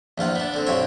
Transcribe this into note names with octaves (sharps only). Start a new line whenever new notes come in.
A#1 E2 F4 F#5
B3 D4
D3 C4
B1 G2 B2 C4 C#5 C6